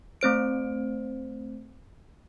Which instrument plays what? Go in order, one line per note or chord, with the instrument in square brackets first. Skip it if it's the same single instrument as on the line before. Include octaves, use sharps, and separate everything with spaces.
[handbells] A3 C4 C5 D7